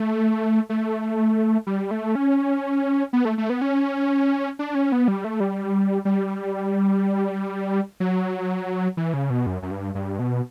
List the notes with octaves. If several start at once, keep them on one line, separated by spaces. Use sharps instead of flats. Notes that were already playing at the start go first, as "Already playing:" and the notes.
Already playing: A3
A3
G3
A3
C#4
B3
A3
A3
B3
C#4
D4
C#4
B3
G3
A3
G3
G3
F#3
E3
C#3
B2
F#2
F#2
G2
G2
B2